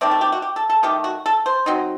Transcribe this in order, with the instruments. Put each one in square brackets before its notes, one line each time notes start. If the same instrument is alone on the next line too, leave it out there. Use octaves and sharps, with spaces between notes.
[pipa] D#3 A3 C4 D5
A4
G4
F#4
G4
A4
A4
D#3 A3 D#4 G4
F#4
A4
C5
F#3 C4 D#4